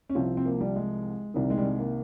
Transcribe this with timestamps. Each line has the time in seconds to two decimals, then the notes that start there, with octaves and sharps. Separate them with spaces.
0.09 C#4
0.15 C2 C3 F3 C4
0.37 C4
0.46 A#3
0.61 G3
0.76 G#3
1.34 C2 C3 D#3 G3
1.50 G#3
1.58 G3
1.65 G#3
1.79 A#3